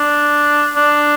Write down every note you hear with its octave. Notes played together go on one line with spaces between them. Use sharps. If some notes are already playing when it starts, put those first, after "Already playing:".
Already playing: D4
D4